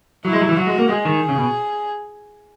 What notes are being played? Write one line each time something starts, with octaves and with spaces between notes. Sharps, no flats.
F#3 E4
G#3
F#3
E3
F#3 F#4
G#3
A#3
G#3 G#4
D#3
C#3
B2